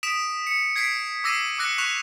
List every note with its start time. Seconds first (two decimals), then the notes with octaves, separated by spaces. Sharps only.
0.03 D#6 B6 D7 E7
0.47 C#7
0.76 G#6 B6 C7 D7
1.24 D6 E6 A#6 C7 D#7
1.58 D6 E6 F#6 A#6 C#7
1.78 C#6 F#6 B6 E7 F7